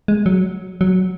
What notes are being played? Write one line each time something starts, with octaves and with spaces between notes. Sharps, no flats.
G#3
F#3
F#3